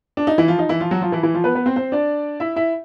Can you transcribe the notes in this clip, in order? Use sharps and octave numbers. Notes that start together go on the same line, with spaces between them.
D4
D#4
E3 E4
F3 F4
D#4
E3 E4
F3 F4
F#3 F#4
F3 F4
E3 E4
E3 E4
F3 F4
B3 B4
B3 B4
C4 C5
C4 C5
D4 D5
E4 E5
E4 E5